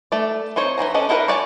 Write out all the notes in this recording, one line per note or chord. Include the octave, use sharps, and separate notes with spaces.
A3 D5
C4 D#4 C5 C#5
E3 F#3 G#5 A#5
C#4 D4 A4 D5 D#5
D#4 E4 G#4 A#4 B4
C#5 D5 F5 G#5